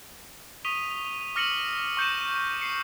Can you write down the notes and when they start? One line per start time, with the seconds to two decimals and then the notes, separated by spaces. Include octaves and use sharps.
0.65 C#6 D#6 B6 D#7 F7 G7
1.36 D6 F6 A#6 C#7 D#7 F#7
1.97 C#6 G6 C#7 E7
2.61 C7 C#7